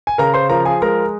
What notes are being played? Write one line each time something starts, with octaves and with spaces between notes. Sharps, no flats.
G#5
C#3 A#4 A#5
C5 C6
F3 A#4 A#5
G#4 G#5
G#3 A#4 A#5